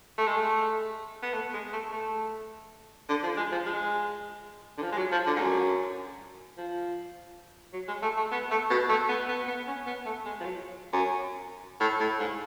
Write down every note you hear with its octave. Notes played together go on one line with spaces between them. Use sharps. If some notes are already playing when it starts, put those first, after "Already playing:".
A3
G#3
A3
B3
A3
G#3
A3
A3
D3
F3
G#3
F3
G#3
D3
F3
G#3
F#3
F3
D3
G#2
F#2
F3
F#3
G#3
A3
A3
B3
A3
B2
A3
B3
B3
B3
C#4
B3
A3
G#3
F3
F#3
F#2
A2
A2
G#2